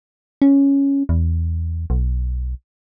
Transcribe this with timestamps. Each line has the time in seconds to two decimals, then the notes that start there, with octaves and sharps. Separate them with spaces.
0.42 C#4
1.09 E2
1.90 B1